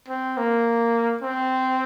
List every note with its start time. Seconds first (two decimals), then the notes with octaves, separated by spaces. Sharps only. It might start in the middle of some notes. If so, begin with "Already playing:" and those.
0.08 C4
0.37 A#3
1.22 C4